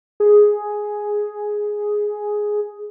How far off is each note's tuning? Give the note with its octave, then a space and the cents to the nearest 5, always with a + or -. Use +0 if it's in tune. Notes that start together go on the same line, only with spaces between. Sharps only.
G#4 +5